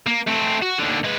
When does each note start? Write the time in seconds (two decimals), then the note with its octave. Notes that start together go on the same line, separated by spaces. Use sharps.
0.06 A#3
0.27 A3 C4
0.62 F#4
0.79 D#2 D3
1.04 G#3 B4